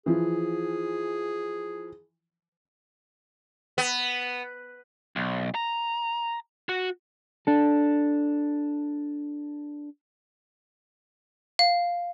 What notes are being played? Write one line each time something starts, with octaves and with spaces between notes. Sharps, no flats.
E3 F3 G#4
B3
B1
A#5
F#4
D4 A4
F5